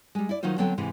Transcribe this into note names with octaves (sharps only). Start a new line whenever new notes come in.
G3 G#3
E4 D5
D#3 F#3 D#4 F4 C5
D3 F#3 B3 C4 A4 G5
G#2 C3 E3